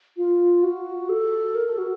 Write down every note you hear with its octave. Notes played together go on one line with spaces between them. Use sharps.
F4
F#4
A4
A#4
A4
F#4